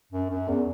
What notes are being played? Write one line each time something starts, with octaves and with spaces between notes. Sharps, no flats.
F#2
F#2
E2